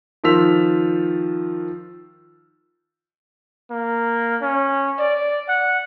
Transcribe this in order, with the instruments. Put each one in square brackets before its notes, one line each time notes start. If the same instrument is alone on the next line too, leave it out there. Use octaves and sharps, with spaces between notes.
[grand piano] D#3 F3 F4 E6 B6 F7
[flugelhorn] A#3
C#4
D5
F#5